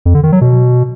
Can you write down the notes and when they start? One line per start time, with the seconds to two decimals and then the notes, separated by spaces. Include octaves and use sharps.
0.06 F2
0.14 D3
0.23 D#3
0.32 F#3
0.41 B2